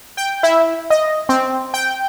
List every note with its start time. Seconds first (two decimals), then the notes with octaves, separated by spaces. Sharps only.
0.17 G5
0.43 E4
0.90 D#5
1.29 C4
1.74 G5